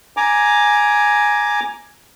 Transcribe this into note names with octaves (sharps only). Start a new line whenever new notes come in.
G#5 A#5 D6